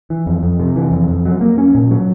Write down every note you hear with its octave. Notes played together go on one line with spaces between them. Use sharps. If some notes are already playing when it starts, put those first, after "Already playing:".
E3
F2
F2
C3
E3
F2
F2
F#3
A#3
C#4
A#2
F#3